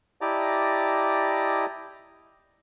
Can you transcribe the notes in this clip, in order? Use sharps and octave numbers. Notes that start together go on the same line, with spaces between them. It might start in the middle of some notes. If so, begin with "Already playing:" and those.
E4 G4 D5 D#5 A5 A#5